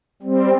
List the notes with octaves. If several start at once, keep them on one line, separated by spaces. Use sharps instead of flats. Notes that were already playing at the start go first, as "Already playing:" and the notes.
G3 C4